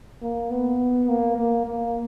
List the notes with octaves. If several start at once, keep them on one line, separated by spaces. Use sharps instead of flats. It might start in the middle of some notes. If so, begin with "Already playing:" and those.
A#3
B3
A#3
A#3
A#3